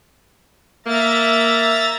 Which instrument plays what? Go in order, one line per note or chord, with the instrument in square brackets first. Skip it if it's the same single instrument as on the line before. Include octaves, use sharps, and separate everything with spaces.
[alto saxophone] A#3 [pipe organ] E5 A#5 A6